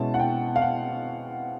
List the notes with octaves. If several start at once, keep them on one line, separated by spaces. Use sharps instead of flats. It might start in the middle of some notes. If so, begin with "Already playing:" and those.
Already playing: B2 G#3 C#4 E4 A5
F#5
G5
F5
F#5